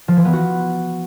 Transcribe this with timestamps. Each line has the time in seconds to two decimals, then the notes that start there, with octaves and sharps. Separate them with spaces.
0.08 F3
0.17 E3
0.25 B3
0.33 F#4